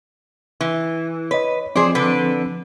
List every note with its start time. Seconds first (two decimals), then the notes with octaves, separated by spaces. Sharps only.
0.61 E3
1.31 B4 C#5 D#5
1.76 F3 C4 G#4 C5 D5
1.95 D3 D4 B4